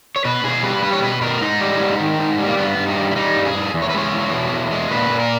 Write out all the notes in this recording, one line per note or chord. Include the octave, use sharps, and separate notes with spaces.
C#5
B2 B4
B2 G#4
G3 B4
G3 B4
C#5
B2 B4
B2 A#4
G#2 D#4
G3
G#2
D#3
G#2
G3
A#3
G2 B3
G2
D#4
G3
E4
G3 D#4
G2
G#4
G2
E2
C#5
B4
G#3 C#5
E2
B2
E2
G#3
A#2 B4
A#2
A#4